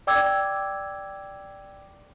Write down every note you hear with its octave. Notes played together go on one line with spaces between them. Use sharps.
D5 G5 D6 E6 G#6